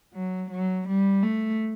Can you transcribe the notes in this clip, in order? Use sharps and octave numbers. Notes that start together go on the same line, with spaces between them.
F#3
F#3
G3
A3